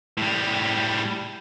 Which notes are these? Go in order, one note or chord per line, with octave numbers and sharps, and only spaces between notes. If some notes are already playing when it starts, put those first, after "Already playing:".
A2 G3